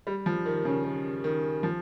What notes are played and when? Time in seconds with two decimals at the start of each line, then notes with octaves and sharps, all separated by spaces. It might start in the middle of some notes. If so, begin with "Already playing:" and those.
0.07 G3
0.26 F3
0.46 D#3
0.65 C#3
0.84 D#3
1.24 D#3
1.63 F3